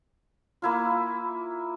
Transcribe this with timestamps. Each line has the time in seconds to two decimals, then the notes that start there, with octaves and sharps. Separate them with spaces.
0.62 A#3 E4 F4